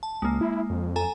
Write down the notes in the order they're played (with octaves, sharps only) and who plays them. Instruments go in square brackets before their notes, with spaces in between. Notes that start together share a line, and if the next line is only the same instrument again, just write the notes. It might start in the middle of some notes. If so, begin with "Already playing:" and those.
[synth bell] A5
[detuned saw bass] C#2 [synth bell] G#3 A#3
[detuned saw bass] E4
F2
[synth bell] A4 G#5 A#5